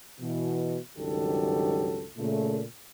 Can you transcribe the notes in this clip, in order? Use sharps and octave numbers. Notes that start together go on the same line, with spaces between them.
B2 E3
C#2 G2 D#3 F#3 G4 A4
A#2 C#3 A3